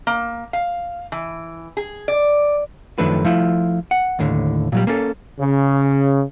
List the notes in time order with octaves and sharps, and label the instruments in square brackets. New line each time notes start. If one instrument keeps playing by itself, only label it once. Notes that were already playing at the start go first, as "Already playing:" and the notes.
[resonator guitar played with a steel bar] A#3
F5
E3
G#4
D5
[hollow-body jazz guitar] F#2 D#3 F3 A3 D4 B4
F3 A3 E4 F4
F#5
D#2 A2 D3
A#2 F#3 G3
A#3 C#4 A4
[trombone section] C#3